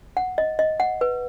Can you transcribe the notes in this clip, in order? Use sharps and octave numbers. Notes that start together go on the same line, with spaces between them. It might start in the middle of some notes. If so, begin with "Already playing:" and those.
F#5
D#5
D#5
F#5
B4